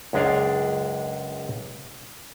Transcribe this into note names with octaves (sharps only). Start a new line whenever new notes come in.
C#2 F#2 G#3 D4 D5 F5